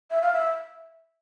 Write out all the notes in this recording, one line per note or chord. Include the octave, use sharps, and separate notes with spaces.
E5
F5
E5